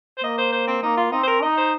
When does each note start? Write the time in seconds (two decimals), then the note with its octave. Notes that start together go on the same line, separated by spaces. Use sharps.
0.17 C5
0.23 A#3 D#5
0.38 C5
0.52 C5
0.67 C4
0.83 A#3 D#4
0.97 F4
1.12 C4 D#4
1.23 C5
1.27 A#4
1.42 D#4 D#5
1.57 C5